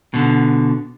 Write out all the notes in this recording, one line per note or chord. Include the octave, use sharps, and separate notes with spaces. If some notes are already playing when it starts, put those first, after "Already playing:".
B2 D3